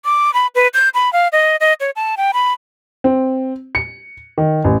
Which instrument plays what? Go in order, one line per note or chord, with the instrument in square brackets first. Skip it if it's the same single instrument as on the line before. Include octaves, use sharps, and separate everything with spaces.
[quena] D6
B5
B4
G6
B5
F5
D#5
D#5
C#5
A5
G5
B5
[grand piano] C4
C#7
D#3
A1